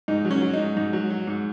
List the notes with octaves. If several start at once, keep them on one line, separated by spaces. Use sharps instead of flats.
G#2 D#4
F#3
C#4
F#3
D#4
G#2
G#2
F#3
F#3
G#2